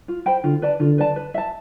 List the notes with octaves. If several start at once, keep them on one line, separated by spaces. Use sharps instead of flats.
F4
C5 G5 B5
D3 F4
B4 D5 A5
D3 F4
B4 D5 A5
B4
E5 A5